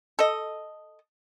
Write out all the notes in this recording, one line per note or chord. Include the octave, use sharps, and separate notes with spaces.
A4 D#5